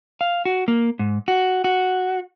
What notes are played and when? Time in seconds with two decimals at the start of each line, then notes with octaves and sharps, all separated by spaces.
0.21 F5
0.45 F#4
0.68 A#3
0.99 G#2
1.28 F#4
1.64 F#4